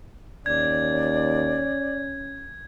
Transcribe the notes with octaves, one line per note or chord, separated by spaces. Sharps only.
D#2 C#4 D5 G#6